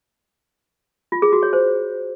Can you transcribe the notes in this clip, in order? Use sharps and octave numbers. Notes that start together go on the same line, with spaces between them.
F4
G#4
F#4
C#5
C5